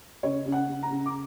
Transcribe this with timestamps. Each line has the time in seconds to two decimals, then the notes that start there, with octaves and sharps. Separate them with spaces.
0.23 C#3 C#5
0.46 C#3
0.52 F#5
0.67 C#3
0.83 A#5
0.91 C#3
1.06 D6